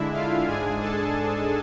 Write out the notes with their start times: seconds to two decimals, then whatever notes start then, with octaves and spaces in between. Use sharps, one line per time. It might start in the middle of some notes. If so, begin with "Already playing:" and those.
Already playing: D3 G#3 D4 E4 E5
0.14 F4 F5
0.47 G#2 G#3 D4 G#4 G#5
0.81 A4 A5